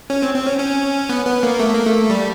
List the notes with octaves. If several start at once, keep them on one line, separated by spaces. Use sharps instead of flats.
C#4
C4
C4
C#4
C#4
B3
B3
A#3
A3
A#3
A3
G3